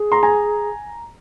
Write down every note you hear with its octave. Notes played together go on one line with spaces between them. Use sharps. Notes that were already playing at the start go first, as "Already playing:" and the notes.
Already playing: G#4
A#5 C6
G#5 A#5